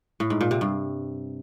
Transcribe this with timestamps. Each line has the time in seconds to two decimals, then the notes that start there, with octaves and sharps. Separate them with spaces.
0.20 A2
0.30 G#2
0.41 A#2
0.51 C3
0.61 G2